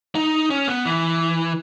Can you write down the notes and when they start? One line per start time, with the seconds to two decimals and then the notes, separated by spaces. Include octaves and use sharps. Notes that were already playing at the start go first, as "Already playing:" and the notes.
0.15 D#4
0.50 C#4
0.68 B3
0.85 E3